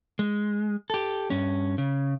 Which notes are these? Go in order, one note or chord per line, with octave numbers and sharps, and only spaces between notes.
G#3
G4 A4
G2 C#4
C#3